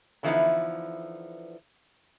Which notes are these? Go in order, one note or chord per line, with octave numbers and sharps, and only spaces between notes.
D3 E3 F3 B3 D#4 E4